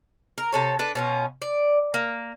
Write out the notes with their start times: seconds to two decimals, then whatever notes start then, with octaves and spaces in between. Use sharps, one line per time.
0.38 A#4
0.53 C3 A4 C#5
0.79 D4 A4 B4
0.95 B2 C#4 F4
1.42 D5
1.94 A#3